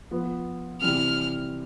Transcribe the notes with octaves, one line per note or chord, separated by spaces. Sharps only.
F3 B3 F4 B4
C3 E3 G3 C4 E4 F6